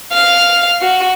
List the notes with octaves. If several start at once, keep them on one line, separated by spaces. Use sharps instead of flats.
F5
F#4